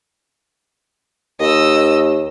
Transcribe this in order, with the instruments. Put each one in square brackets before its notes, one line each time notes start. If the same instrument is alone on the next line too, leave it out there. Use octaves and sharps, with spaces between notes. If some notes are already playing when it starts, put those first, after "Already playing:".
[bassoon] D#2 [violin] D#5 E6